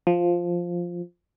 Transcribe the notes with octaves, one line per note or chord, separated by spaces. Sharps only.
F3